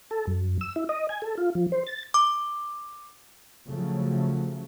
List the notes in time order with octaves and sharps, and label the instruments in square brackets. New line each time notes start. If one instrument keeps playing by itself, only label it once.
[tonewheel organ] A4
F#2
E6
E4
D#5
G#5
A4
F4
F3
C5
A6
[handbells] D6
[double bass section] C#3 F3 F#3 A3